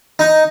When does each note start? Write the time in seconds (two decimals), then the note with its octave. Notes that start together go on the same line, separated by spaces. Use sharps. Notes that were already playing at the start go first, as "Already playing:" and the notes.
0.19 D#4